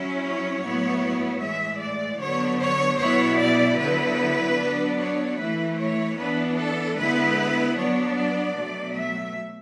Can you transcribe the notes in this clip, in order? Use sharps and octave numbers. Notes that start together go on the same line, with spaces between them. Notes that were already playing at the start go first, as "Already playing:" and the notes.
Already playing: F#3 C#4 E4
C#5
A2 F#3 B3 E4
A2 E3 G#3 E5
D5
D3 F#3 B3 C#5
C#5
B2 F#3 B3 E4 C#5
D5
D3 F#3 B3 E4 B4
F#3 B3 D4
C#5
E3 A3 E4 B4
C#5
E3 B3 D4 B4
A4
D3 G#3 B3 E4 B4
F#3 B3 D4 C#5
D5
B2 F#3 A3
E5